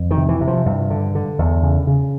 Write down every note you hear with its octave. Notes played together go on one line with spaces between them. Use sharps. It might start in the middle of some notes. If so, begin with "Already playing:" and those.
Already playing: F2
D#3
C3
E3
C3
F3
G2
D3
D3
E2
C#3
C#3